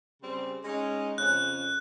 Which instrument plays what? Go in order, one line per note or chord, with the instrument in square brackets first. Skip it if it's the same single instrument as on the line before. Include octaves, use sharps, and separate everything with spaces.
[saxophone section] C#3 G3 C4
G#3 C#4 D#4
[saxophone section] F2 C#3 [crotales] F#6